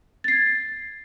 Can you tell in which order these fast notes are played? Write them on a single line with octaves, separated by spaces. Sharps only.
A6 C7 G#6